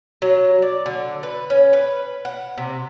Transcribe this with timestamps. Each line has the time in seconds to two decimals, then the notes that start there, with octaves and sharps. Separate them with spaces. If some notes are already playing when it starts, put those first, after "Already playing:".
0.22 F#3
0.62 D5
0.86 D3
1.23 B4
1.50 C#4
1.73 B4
2.25 F#5
2.58 C3